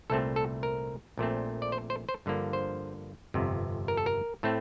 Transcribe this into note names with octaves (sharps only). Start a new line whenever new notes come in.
C2 A#2 A3 C4 A4
A4
A#4
A#1 A#2 A3 C4
D5
C5
C5
C5
G2 D3 F3 A#3
C5
G1 F2 C3
A#4
A4
A#4
A2 A3 C4